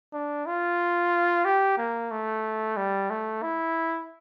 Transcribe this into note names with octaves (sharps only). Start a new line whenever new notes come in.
D4
F4
G4
A#3
A3
G3
A3
E4